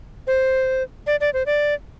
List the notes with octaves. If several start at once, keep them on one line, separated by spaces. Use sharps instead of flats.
C5
D5
D5
C5
D5